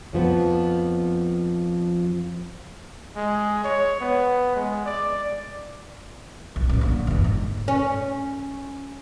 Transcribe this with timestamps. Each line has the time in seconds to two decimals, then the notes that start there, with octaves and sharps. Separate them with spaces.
0.13 F2 F3 B3
3.16 G#3
3.64 C#5
4.00 B3
4.55 G#3
4.86 D5
6.56 D1 C2
6.69 A1 G3
6.81 D3 A#3
7.07 G1 E2
7.24 G#2
7.68 C#4